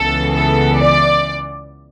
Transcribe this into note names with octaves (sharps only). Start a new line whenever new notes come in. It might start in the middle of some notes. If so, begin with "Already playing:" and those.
Already playing: C#2 C#3 E3 B3 A4
A4
D5